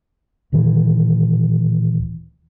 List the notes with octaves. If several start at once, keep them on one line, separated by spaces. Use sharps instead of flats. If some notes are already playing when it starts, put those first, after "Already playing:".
D1 A#2 D#3 E3